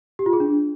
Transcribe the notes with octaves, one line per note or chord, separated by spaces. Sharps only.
G4
F4
G#4
D4